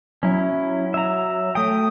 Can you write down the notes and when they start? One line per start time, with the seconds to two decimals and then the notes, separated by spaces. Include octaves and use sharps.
0.23 F#3 C#4 E4
0.94 E5 A#5
1.55 A3 G5 D#6